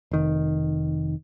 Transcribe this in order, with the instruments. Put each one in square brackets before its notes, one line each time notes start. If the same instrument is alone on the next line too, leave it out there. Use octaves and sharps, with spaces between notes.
[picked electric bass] F1 D#3